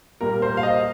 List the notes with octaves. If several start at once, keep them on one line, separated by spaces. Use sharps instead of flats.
A#2 G3 A#3 A#4
C5
F5
D#5